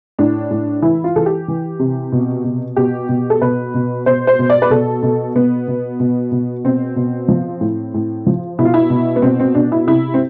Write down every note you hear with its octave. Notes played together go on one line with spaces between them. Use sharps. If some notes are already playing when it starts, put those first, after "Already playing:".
A2 D4
A2
E3 E4
F4
E3 A4
G4
E3
C3
B2
B2
B2 G4
B2
A4
B2 B4
B2
B2 C5
C5
B2
D5
B4
B2 A4
B2
B2 B3
B2
B2
B2
B2 C4
B2
F3
A2
A2
F3
B2 E4
F4
E4
B2
B3
B2 C4
C4
B2 D4
E4
C3 E4
C4